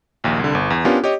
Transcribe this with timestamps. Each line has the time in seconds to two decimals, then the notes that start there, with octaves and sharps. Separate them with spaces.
0.24 A#1 D#2
0.39 C2 D3
0.55 G1
0.70 E2
0.85 B3 C#4 D4 F4 G4 A#4
1.04 G4 C#5 D#5